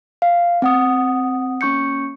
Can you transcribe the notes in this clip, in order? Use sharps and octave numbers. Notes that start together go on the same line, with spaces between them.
F5
C4 F#5 D#6
A#3 C#4 C#6 G6 C#7